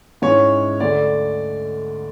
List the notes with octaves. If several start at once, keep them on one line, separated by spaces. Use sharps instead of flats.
G#2 G#3 C#4 E4 C#5
D2 D3 A3 D5